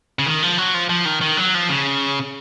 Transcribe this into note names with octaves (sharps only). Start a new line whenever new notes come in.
C#3
D#3
F3
F#3
F3
F3
D#3
D#3
F#3
F3
C#3